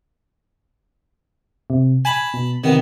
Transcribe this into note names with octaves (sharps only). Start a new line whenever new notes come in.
C3
G#5 A5 B5
B2
C3 D#3 B3